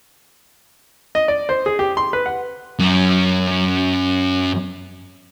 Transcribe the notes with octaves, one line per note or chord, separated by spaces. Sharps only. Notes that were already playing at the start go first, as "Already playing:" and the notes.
D#5
D5
C5
G#4
G4
C6
B4
F#5
F#2 C#4